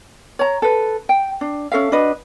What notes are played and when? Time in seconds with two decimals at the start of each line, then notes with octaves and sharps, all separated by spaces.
0.39 C#5 A#5
0.62 A4 B4
1.09 G5
1.41 D4
1.72 C#4 A4 E5 F5
1.92 D4 F#4 B4 D#5